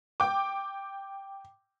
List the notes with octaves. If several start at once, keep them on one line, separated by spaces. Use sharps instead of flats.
G5 D6